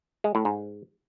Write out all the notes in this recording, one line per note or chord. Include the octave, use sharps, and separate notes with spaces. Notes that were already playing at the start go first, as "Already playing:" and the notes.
G#3
A2
G#2